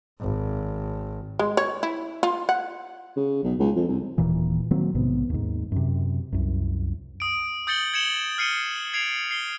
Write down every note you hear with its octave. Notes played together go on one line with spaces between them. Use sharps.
G#1
G#3
C#5
E4
F4
F#5
C#3
B1
C#2
F2
C2
D#1 D#2 A#2 E3
D#3 F#3 A#3 C4
A#1 G#2 C3 B3
D#2 G#2
F#2 C3
C2 F#2
D#6 D7
D#6 G6 A6 C#7 F#7 G7
G#6 C#7 E7 F#7 G7
F6 C7 C#7 D#7 G7
G#6 C7 D7 F7
C7 G7